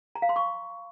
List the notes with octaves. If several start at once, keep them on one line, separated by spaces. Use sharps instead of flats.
A#5
F5
C6
C#6